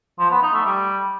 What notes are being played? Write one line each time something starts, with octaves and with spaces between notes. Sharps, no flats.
F3
B3
D#4
A3
G3